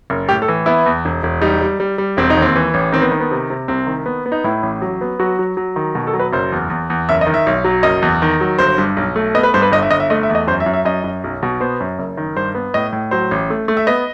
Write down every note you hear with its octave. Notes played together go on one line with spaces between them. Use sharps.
F#1
A2 G4
A4
E3
B3 E4
E2
E1
E1
G3 D#4
G3
G3
G3
E1 C4
D#4
D#2
C4
E3
A1
D#3 C4
B3
D#3
B3
C3
C3
C2 C4
D#3
B3
B3
D#4
A2 E4
A1
F#3
B3
F#3 F#4
F#3
F#3
D#3
B2
A4
F#3
B4
F#1 C5
E2
E2
E2
F#1 E5
D#5
D#3
E5
B1
F#3
F#1 D#5
E2
D#3
F#3
G1 C5
G2
B1
A3
B3 D#5
B4
G2 C5
B4
G1 D#5
E5
G1 D#5
E5
A3 D#5
E5
E2
D#5
F#2 C5
E5
F#2
E5
F#2 D#5
F#2
B1
B2
B3 C5
F#2
F#1
D#3
G2 C5
B3
A2 D#5
A2
F#3 C5
A1
A3
A3
E5
B3 D#5